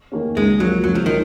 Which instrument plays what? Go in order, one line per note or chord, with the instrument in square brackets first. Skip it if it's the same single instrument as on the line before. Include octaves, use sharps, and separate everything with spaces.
[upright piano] D#3 A#3 C#4
[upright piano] C#2 [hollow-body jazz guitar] G#3
[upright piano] C#3 F3 A#3 [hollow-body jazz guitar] F#3
[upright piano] C#2 [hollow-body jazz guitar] F#3
[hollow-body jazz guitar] F3
[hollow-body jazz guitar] D#3 [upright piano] C#4